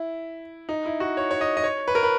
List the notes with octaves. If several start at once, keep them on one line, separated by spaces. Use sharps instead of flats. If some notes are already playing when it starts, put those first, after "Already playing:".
Already playing: E4
D#4
E4
F#4
C#5
C#5
D#5
D#5
C#5
B4
A#4
B4